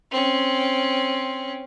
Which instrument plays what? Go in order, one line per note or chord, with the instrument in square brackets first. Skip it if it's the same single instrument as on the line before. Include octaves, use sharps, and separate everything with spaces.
[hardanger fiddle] C4 C#4